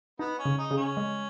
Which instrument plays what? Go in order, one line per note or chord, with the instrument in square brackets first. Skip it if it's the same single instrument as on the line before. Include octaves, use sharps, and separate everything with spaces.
[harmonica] B3 [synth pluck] D#4
[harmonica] C#4
[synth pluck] C#3
[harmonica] D#4
[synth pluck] C#3
[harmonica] C#4
[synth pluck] G#3